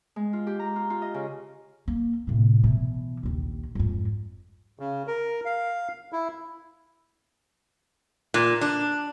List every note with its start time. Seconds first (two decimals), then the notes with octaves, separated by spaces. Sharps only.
0.16 G#3
0.33 F4
0.47 G4
0.59 A#5
0.76 F4
0.90 F4
1.02 D#5
1.14 C#3
1.88 A#3
2.27 A2 C3
2.64 B2 E3
3.23 A#1 D#2
3.75 F2 G#2
4.79 C#3
5.07 A#4
5.45 F5
6.13 E4
8.34 A#2
8.61 D4